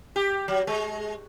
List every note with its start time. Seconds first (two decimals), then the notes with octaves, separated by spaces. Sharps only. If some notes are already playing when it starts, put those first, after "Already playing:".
0.16 G4
0.48 F#3
0.67 G#3